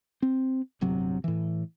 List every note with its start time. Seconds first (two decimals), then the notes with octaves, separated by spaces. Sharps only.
0.22 C4
0.81 D1 G1 C3 F#3
1.24 A2 E3